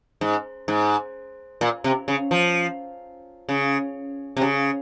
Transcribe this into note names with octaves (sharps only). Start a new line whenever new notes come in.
G#2
G#2
A#2
C3
C#3
F3
C#3
C3
C#3